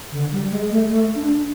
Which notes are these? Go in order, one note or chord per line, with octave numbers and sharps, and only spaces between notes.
D3
G3
G#3
A3
A3
D4